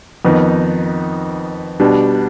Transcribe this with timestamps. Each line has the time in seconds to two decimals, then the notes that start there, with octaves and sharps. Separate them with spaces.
0.25 F2 D#3 B3 D#4
1.80 B2 G3 D4